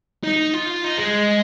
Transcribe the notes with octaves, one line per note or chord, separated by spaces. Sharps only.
D#4
F4
D#4
G#3